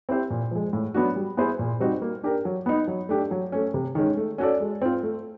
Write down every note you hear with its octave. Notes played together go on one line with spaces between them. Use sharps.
C4 E4 G4 C5
A#2
F3 G#3
A2
F#3 B3 D4 F#4
G3
B3 E4 G#4 C5
A#2
G3 C4 D#4 F#4
A#3
D4 G4 A#4
F#3
B3 D#4
F#3
A3 D4 G4
F#3
A3 C#4
C3
D#3 G#3 C#4
A3
C#4 F#4 A4 D5
G#3
C4 F4
A3